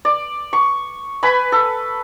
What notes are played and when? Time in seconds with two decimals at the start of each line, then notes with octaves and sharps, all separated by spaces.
0.05 D5
0.53 C#6
1.23 B4 G#5 B5
1.52 A4